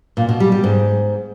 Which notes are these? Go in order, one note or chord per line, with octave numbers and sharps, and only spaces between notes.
A#2
B2
G3
G3
G#2